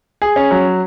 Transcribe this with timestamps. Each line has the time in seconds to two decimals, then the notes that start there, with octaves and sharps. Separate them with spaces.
0.22 G#4
0.36 C#4
0.51 F#3